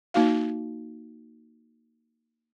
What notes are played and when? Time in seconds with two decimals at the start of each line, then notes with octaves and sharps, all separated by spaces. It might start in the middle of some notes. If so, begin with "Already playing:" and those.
0.14 A#3 D#4 F#4 F5